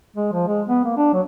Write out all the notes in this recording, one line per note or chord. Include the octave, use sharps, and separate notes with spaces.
G#3
F3
G#3
B3
A#3
D4
F#3